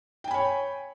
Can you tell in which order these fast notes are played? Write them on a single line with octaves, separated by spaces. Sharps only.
G5 G#5 B5 C#5